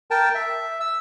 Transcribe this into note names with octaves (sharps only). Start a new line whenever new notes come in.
A#4 G5 A5
E5
E6